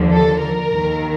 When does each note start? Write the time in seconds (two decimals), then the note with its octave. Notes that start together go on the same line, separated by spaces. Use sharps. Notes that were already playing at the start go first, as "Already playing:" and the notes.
Already playing: D#2 D3 F3
0.12 A4
0.41 A#4
0.71 D#2 D#3